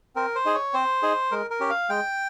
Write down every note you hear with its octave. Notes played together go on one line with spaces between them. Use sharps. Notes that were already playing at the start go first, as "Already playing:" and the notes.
C4 A#4
C5
D#4 G#4
C#5
C4 C5
D#4 G#4
G#3 A#4
A#4
C#4 G4
F5
G#3 G5